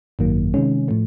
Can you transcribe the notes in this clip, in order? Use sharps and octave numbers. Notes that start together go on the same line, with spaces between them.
G#1 F#2 D#3 F#3 A#3
C3 D#3 G#3 C#4
A2 F3 A3